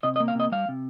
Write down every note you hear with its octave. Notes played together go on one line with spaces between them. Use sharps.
C3 D#5
D#5
A#3
F5
C3 D#5
G3 F5
C3